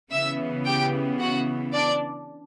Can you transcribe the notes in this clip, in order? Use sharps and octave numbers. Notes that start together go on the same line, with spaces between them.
C#3 E3 B3 E5 E6
G4 G5
F#4 F#5
D4 D5